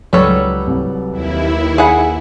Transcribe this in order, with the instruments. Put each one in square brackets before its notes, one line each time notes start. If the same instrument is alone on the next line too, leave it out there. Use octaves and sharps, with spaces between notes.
[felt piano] C#2 [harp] F#3 A4 B4 [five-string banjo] G3 C#5
[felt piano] C2
[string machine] D#2 E4
[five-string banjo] G#4 F#5 [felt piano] G#5 B5